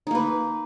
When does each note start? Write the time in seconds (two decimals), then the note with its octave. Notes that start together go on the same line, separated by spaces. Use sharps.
0.07 D#4
0.11 A#3
0.15 B4